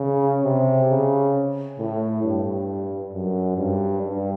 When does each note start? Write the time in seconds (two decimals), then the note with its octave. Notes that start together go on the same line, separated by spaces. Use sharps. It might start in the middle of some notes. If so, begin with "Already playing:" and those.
Already playing: C#3
0.44 C3
0.90 C#3
1.79 A2
2.23 G2
3.13 F#2
3.57 G2
4.02 G2